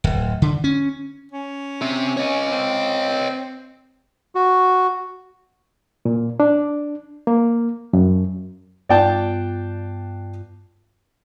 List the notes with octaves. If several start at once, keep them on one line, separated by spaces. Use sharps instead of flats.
D1
D3
C#4
C#4
C4 E5
C#5 D#5
C4
F#4
A#2
D4
A#3
F#2
G2 B3 F4 D5 G5 A5